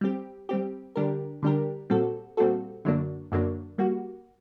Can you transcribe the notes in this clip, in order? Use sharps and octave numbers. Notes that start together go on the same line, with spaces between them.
G3 C4 G4
G3 C4 G4
D3 G3 D4 G4 A#4
D3 G3 D4 G4 A#4
A#2 G3 C4 F#4 A4
A#2 G3 C4 F#4 A4
F#2 D3 F#3 A#3 D4
F#2 D3 F#3 A#3 D4
G3 A#3 F#4